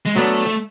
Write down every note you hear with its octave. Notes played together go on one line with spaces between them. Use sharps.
G#3
F#3 A3 B3 D4